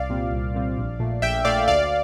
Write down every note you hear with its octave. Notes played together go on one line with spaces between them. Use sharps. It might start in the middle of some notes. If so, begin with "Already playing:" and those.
Already playing: C2 D5 F5
A#2 G3 C4 F4
C2
A#2 G3 C4 F4
A#1
A#2 A3
A#1 E5 G5
A#2 A3 D5 F5
D2 D5 F5